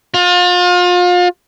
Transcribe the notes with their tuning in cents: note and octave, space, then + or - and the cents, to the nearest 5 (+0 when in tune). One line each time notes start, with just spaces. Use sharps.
F4 +35